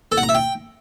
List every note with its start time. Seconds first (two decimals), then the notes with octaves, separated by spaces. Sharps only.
0.12 A4
0.17 F#5
0.23 A#5
0.29 E5
0.35 G5